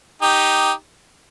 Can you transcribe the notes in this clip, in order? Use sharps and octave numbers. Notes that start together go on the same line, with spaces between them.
D#4 G4